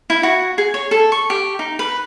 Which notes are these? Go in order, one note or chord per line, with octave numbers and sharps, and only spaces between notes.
E4
F#4
G#4
C#5
A4
C#6
G4
D#4
B4